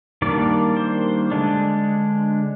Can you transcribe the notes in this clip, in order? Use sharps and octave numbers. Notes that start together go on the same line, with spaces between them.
D#3 G3 A#3 D4 D5
C5
D3 G#3 D4